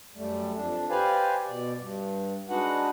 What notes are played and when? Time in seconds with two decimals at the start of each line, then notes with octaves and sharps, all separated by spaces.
0.16 F#2 G3 A3
0.55 F2 D4
0.90 G4 B4 C5 D5 F5 G#5
1.48 B2 D5
1.78 G2
2.49 G#3 D4 D#4 F#4 B4 F#5